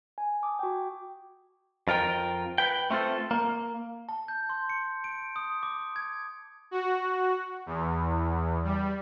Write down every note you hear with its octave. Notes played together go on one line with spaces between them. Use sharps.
G#5
A5 D6 D#6
F#4 G5
F2 F4 A#4 G5
B4 G5
A3 C4 F4 A4
A#3
A5
G6
C6
C#7
D7
D#6
D6
G#6
F#4
E2
G3